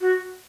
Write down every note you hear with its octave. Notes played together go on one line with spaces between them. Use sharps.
F#4